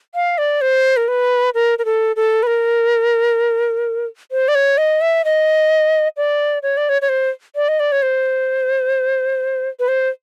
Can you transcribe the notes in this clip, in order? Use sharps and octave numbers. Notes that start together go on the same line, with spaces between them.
F5
D5
C5
A#4
B4
A#4
A#4
A4
A4
B4
A#4
C5
D5
C#5
D#5
E5
D#5
D5
C#5
D5
C#5
C#5
C5
D5
D#5
D5
C#5
C5
B4
C5